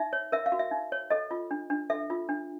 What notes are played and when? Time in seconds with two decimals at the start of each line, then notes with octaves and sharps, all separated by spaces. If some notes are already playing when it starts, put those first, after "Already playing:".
Already playing: D#4 E5
0.13 C#5
0.32 A#4 E5
0.46 F5
0.52 F#4
0.59 E5
0.71 D#4
0.92 C#5
1.10 A4 D#5
1.31 F4
1.51 D4
1.70 D4
1.90 A4 E5
2.10 F4
2.29 D4